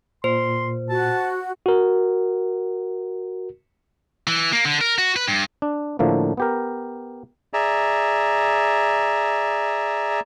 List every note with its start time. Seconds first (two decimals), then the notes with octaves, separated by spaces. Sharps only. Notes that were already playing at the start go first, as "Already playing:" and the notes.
0.24 A#2 C5 C6
0.90 F#4 A5
1.66 F#4 A#4
4.27 E3
4.53 A#3
4.65 D3
4.81 A#4
4.98 F#4
5.16 B4
5.28 G2
5.62 D4
5.99 A2 D3 F3 A3 A#3
6.37 B3 G4 A#4
7.53 G#4 D5 E5 A#5